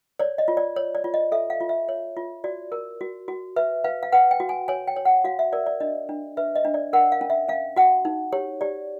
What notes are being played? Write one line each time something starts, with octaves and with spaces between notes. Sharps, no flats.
C#5 D5
D#5
F4
D5
C#5
D5
F4
D#5
A4 E5
F5
F4
E5
C#5
F4
F#4 D5
A#4
F#4
F#4
B4 E5
B4 F5
F5
B4 F#5
G5
F#4
G#5
C#5 G#5
G5
C#5
F#5
F#4 F5
E5
A#4 D5
D5
D4 D#5
D4
B4 E5
D#5
D4
D5
A#4 F#5
F5
C#4
E5
C#4 F5
F#4 F#5
D#4
G4 C#5
G4 D5